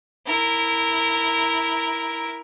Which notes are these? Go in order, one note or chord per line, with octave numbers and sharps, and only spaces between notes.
E4 A#4